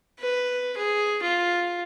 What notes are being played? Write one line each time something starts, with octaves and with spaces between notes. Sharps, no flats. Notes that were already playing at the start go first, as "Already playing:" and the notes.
B4
G#4
F4